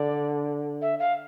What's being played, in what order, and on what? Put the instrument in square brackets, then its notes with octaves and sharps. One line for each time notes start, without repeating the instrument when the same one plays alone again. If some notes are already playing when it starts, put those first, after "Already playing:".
Already playing: [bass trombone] D3 [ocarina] D5
[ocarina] E5
F5